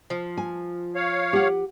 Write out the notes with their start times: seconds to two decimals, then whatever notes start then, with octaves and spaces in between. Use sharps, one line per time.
0.10 F3
0.37 G#5
0.96 C#5 F5
1.33 G4 F#5